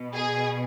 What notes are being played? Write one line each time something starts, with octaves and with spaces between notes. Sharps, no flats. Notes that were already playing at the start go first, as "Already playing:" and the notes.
Already playing: B2
G#4